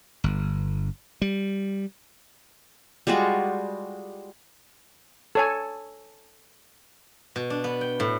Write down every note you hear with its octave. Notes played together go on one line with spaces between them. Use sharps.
G1
G3
G3 G#3 F4 F#4
A4 C#5 G#5
B2
D4
B3
G5
A2